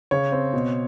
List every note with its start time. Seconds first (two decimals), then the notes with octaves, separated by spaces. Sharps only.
0.11 C#3 C#5
0.32 C4
0.53 B2